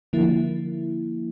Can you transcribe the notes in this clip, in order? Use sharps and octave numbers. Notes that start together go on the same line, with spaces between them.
D3 F3 A#3 E4